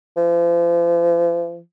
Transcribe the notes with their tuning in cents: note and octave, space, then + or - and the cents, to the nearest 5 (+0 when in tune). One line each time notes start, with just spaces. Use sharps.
F3 -40